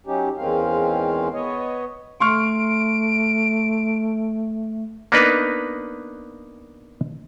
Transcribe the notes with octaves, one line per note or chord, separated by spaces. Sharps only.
F#3 C#4 D#4 G4
E2 D#3 G#3 C4 C#4 F5
B3 C#5 D#5
A3 C6 C#6 F6 D7
A#3 B3 D4 D#4 A#4 B4